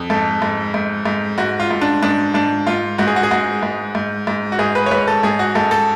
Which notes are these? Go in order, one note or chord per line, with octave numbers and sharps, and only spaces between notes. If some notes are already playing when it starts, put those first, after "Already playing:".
Already playing: F2
G#2 A4
G#2
G#2
G#2
G#2 F#4
F4
G#2
D4
G#2 D4
G#2 D4
G#2 F4
G#2 F#4
G#4
F#4
G#4
G#2 F#4
G#2
G#2
G#2
F#4
G#2 G#4
B4
C#5
G#2 B4
A4
G#2 G#4
F#4
G#2 A4
A4